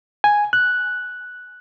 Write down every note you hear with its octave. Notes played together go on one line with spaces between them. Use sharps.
G#5
F#6